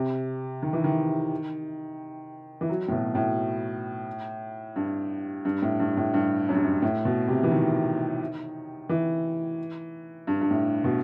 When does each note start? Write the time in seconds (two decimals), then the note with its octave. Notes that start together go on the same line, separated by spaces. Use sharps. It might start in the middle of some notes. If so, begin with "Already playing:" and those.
Already playing: C3
0.62 D#3
0.73 E3
0.84 D#3
2.61 E3
2.69 F#3
2.88 A2
2.91 B2
3.15 A2
4.76 G2
5.45 G2
5.62 A2
5.80 G2
5.97 A2
6.14 G2
6.49 F#2
6.55 G2
6.63 F#2
6.82 A2
7.05 B2
7.28 C3
7.43 E3
7.52 D#3
8.89 E3
10.27 G2
10.41 G2
10.51 A2
10.84 B2